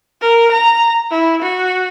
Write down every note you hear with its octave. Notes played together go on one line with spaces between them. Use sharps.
A#4
A#5
E4
F#4